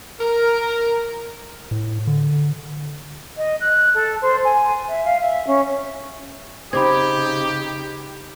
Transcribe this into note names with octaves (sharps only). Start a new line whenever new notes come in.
A#4
A2
D3
D#5
F#6
A4
C5
G#5
E5
F5
E5
C#4
C#3 C4 D#4 G4 B5 D6 G#6